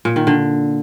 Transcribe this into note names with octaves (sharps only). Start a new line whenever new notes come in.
A#2
D#3
D3